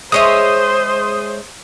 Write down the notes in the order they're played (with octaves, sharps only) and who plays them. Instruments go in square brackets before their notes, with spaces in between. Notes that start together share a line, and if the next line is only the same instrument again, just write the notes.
[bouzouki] G#3 C#5 E5 [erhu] C5 [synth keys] C6 D#6